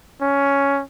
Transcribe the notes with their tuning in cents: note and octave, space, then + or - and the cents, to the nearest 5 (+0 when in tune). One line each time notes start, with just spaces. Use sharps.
C#4 +10